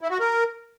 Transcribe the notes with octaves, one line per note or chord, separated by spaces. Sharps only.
E4
F#4
A#4